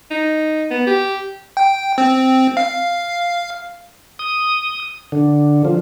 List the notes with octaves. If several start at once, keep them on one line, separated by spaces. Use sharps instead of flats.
D#4
B3
G4
G5
C4
F5
D#6
D3
F3